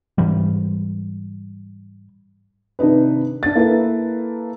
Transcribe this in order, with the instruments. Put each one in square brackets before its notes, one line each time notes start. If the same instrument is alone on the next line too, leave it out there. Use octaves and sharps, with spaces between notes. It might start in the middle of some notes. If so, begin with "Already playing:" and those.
[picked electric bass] G#2 E3 G3
[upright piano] C3 D#3 D4 D#4 B4
D4 A6
A#3 E4 A4 B4